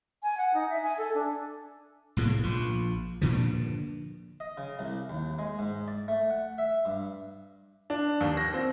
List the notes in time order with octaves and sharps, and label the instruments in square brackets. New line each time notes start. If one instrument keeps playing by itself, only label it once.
[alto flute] G#5
F#5
D#4
E5
G#5
A4
D4
[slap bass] C2 A2 C#3 A#3
A#1 F3
G2 A#2 D3 F3
[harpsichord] D#5
C#3
C2
D#2
G#3
G#2
D5
A3
F#5
E5
G2
[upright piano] D4
D#2
A#6
C4